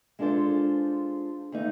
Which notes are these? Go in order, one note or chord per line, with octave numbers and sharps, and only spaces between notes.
G#3 D4 F4 A4 C5
D#2 A3 D#4